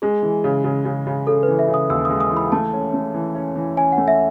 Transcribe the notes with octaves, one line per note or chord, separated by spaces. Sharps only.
G#3 G#4
E3
C#3
C#3
C#3
C#3
C#3 A4
B4
E3
E5
C#3
D#6
D#2 E6
G#3 D#6
D#6
E3
B5
A3 A5
C#4
A3
E3
C#4
E3
C#4 G#5
F#5
A3
E5